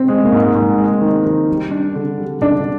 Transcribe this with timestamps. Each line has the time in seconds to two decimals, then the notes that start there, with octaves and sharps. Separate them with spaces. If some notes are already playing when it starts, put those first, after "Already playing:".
Already playing: C4
0.08 G#3
0.24 A#3
0.32 G#2
0.55 G#2
0.78 G#3
1.01 D#3
1.26 D#3
1.49 G3
1.71 D4
1.95 D3
2.18 G3
2.42 D3 D4